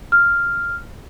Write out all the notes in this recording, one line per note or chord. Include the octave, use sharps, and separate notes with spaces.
F6